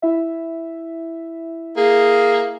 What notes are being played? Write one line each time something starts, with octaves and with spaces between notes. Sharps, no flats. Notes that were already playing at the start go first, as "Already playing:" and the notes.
E4 E5
A#3 G#4